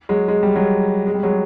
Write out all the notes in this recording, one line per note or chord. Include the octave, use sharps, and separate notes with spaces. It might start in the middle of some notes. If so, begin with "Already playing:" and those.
F#3 G#3
G#3
G3
F#3 G#3
G#3
G3
F#3 G#3